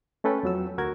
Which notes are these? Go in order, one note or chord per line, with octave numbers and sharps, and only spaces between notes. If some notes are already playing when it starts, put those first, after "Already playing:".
A3 C#4 A4 B4 G5
F2 F#3 E6
D2 F#4 A#4 G#6